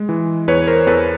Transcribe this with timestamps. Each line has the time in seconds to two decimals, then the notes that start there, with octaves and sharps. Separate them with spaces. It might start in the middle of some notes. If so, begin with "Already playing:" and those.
Already playing: G#3
0.09 E3
0.48 E2 B4 C#5
0.67 A#4 C5
0.87 E2 A4 B4